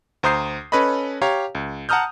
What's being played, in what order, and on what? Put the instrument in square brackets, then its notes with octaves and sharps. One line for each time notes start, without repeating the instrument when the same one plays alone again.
[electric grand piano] D2 C5 A#5 D#6 G6 C7
C#4 A4 B4 C#5 D#5 B5
G4 C#5 F5 A#5
C#2
F#5 A5 A#5 D#6 F6 G6